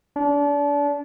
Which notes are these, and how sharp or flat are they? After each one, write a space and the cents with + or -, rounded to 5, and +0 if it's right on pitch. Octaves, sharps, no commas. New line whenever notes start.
D4 -30